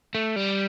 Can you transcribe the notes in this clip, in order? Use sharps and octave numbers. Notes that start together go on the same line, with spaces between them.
A3
G3